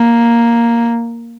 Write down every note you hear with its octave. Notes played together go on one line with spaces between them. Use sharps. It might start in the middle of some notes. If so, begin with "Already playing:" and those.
Already playing: A#3